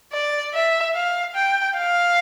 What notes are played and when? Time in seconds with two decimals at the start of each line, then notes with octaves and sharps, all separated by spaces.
0.12 D5
0.54 E5
0.95 F5
1.35 G5
1.77 F5